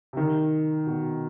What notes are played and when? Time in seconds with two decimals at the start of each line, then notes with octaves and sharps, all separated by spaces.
0.13 C3
0.17 D#3
0.86 B2